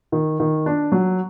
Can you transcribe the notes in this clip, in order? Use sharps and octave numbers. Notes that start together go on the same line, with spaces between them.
D#3
D#3
D4
F#3